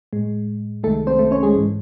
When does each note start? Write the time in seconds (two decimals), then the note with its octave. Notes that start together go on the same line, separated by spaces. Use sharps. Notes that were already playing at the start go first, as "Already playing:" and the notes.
0.13 A2 G#3
0.83 C2 C3 D#3 G#3 A3 A4
1.07 C4 C5
1.19 A3 A4
1.31 C#4 C#5
1.43 G#3 G#4
1.55 G#2 E3 G#3